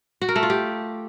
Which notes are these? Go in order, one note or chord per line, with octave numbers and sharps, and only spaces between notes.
F#4
A#4
A3
F4
G4